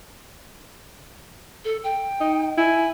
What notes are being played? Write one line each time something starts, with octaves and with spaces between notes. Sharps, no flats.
A4
G5
D#4
E4 G#5